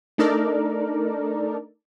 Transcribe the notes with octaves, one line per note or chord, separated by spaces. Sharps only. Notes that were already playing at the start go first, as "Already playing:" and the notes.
A3 D4 D#4 A4 A#4 D5